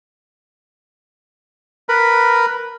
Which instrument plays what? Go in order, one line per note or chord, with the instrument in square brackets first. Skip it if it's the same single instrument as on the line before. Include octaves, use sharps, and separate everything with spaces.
[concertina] A#4 B4 B5